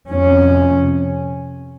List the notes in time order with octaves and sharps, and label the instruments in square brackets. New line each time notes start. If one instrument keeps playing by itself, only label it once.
[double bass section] F2 C3 C#4